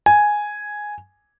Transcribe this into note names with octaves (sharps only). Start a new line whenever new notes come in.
G#5